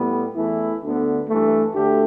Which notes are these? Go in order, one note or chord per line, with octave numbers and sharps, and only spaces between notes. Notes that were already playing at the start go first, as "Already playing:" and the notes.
Already playing: A2 G3 B3
E2 E3 A3 E4
D2 D3 B3
G2 E3 A3
D2 D3 A3 G4